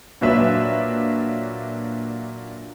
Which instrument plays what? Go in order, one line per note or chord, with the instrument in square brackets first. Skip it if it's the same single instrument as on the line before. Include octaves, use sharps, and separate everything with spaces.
[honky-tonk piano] A#2 F#3 D4 B4 E5